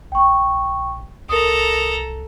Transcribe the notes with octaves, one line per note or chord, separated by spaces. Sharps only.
A#1 G5 C#6
C2 A4 A#4 A#5 D#6